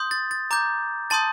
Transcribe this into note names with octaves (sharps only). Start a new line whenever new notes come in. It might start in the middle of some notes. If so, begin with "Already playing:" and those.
Already playing: C6 D#6 G6
A6
A6
A#5 D6 G6
A5 C6 D#6 G6 A6